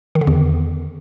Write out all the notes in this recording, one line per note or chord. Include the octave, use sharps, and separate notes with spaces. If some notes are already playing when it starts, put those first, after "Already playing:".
D#3
D3
E2